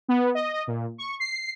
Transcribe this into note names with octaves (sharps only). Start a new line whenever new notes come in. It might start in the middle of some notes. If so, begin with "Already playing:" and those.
B3
D#5
D#5
A#2
C#6
C7